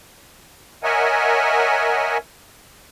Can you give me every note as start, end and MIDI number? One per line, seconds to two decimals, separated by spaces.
0.84 2.18 70
0.84 2.18 73
0.84 2.18 75
0.84 2.18 76
0.84 2.18 78
0.84 2.18 80